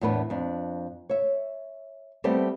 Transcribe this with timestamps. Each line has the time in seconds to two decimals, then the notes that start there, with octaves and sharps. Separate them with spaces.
0.01 E2 A2 A3 B3 D4 B4
0.30 F2 D4
1.09 C#5 E5
2.24 G3 A3 B3 C4 G4 A4